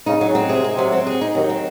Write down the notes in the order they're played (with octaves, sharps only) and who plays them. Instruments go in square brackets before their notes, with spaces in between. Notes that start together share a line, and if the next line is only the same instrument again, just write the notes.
[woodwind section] C#3 [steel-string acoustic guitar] D#4
[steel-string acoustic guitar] F#3
[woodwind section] C#3
[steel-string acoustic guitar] C4
[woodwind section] C3 [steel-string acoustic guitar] G#4
[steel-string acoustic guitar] D#4
[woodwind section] C3 [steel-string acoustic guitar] F#3
[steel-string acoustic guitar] C4
G#4
D#4
[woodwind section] D#2 D#3 [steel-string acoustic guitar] F#3
[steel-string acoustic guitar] C4